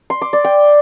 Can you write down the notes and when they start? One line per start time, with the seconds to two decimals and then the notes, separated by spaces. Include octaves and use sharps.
0.10 C6
0.21 D6
0.33 D5
0.44 G5